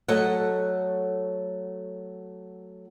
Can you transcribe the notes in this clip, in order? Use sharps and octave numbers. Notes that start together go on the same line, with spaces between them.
F#3 A3 A4 C#5 D#5 F#5